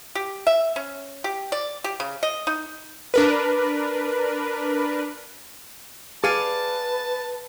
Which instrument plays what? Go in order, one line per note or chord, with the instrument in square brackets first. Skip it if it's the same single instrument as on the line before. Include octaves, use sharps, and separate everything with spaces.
[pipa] G4
E5
C#4
G4
D5
G4
C#3
D#5
D#4
[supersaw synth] D4 A#4 B4
[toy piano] G#4 [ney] B4 [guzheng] D5 F5 G#5 [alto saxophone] A5